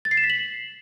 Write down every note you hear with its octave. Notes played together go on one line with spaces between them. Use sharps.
A6
C7
E7
B6
F#7